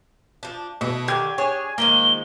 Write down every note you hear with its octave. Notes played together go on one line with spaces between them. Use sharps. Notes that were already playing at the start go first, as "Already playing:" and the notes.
F3 D4
B2 E4 A4
D3 D#3 G4 D6 G#6
D4 G#4 C#5 G#5
D#3 F3 G#3 A#3 G7